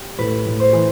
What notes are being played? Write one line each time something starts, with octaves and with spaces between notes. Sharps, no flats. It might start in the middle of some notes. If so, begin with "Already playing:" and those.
Already playing: G4
A2 B4
A2
C5
E3